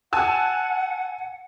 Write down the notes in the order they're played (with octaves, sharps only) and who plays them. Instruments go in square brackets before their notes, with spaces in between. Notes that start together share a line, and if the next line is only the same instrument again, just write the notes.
[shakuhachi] F#5 [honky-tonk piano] G#5 A5 E6